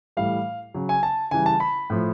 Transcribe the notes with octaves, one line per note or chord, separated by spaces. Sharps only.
A2 E3 G3 F5
C#3 F#3
G#5
A5
C#3 E3 G3 G#5
A5
B5
A2 F3